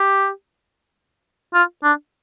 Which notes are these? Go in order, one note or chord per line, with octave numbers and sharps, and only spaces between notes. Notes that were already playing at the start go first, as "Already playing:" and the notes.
Already playing: G4
F4
D4